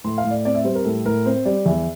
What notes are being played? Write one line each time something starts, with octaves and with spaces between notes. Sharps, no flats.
A2 C6
F5
A2
D5
C4 D5
E5
G3 C5
A#4
A2 A4
A2 A#4
C4 C5
G3 D5
E2 E5